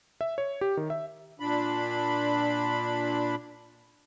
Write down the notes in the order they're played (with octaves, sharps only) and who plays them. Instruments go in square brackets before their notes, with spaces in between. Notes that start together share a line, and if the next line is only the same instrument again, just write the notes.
[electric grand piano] E5
C#5
G4
D#3
E5
[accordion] A#2 D4 B5